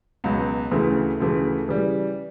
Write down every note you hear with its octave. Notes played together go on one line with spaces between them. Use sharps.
C#2 B2 F#3
D2 C#3 E3 A3
D2 C#3 E3 A3
C#3 E3 G3